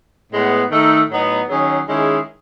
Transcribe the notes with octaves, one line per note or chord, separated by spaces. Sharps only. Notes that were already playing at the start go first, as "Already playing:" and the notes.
A2 G#3 B3
D#3 A3 D#4 A4
A2 F#3 B3 D#4
D#3 F#3 C#4 G#4
D#3 G#3 C#4 E4 G#4